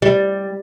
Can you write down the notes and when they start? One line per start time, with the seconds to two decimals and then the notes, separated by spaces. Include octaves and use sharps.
0.02 G3